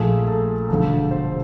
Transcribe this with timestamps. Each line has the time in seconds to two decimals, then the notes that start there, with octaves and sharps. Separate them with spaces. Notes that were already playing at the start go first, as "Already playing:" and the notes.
Already playing: A#1 A#2 F3 A3 G#4
0.27 A4
0.69 E1 D2 D3 F3 A4
1.11 C5